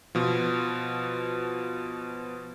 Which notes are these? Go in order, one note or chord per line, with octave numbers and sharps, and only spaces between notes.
B2 F3